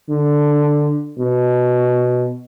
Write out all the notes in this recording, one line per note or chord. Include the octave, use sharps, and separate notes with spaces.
D3
B2